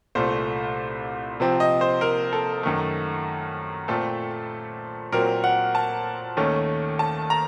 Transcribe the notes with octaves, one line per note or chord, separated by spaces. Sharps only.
C2 A#2 A3 C5
C3 F3 C4
D#5
C5
A#4
A4
F#2 D#3 A3
A#2 A3 C4 A4
A#2 F#3 C4 A#4
F#5
A5
D#2 D#3 A3 C#4
A5
A#5